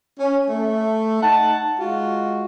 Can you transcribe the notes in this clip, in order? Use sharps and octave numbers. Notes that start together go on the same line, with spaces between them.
C#4
A3
D#4 F#5 A5
G#3 F4 F#4